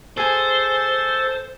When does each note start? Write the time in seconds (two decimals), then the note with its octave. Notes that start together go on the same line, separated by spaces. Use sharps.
0.17 G#4 A4 C5 G#5